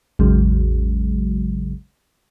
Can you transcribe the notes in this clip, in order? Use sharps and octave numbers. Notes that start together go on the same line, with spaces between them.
A1 E2 C#3 F#3 G#3